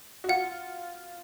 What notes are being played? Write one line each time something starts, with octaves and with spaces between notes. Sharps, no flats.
F#4
F4 F#5